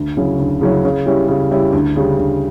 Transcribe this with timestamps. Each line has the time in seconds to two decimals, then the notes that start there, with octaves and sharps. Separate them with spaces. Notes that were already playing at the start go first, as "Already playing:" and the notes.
Already playing: D2
0.17 C#3 F#3 C#4 E4
0.39 D2
0.61 C#3 F#3 C#4 E4
0.85 C#3
1.06 G3 C#4 E4
1.28 C#3
1.51 G3 C#4 E4
1.73 D2
1.96 C#3 G3
2.18 D2